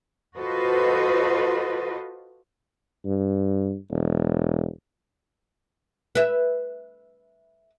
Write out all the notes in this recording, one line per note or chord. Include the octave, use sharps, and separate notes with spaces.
F4 F#4 A4 B4 C5 D#5
G2
E1
B4 E5